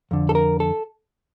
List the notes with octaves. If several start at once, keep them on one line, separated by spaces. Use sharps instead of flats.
F2 D3
A4
A#4
A4